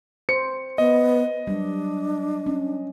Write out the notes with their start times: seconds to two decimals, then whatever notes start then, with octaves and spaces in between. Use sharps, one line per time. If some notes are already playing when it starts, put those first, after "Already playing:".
0.29 C5 C#7
0.78 B3 D#5
1.47 F#3 G3 D4
2.46 C#4